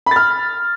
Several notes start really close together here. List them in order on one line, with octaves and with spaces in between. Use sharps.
B5 A6 F6